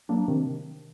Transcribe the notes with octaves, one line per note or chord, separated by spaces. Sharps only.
F#3 A#3 D4
C3 D#3